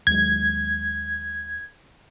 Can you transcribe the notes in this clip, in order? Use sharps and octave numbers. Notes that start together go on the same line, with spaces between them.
D#2 F#3 G#3 G#6